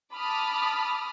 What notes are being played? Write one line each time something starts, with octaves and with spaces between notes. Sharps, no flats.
A5 B5 D6 D#6 F6